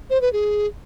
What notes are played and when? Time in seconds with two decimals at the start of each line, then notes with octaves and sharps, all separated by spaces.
0.10 C5
0.21 B4
0.33 G#4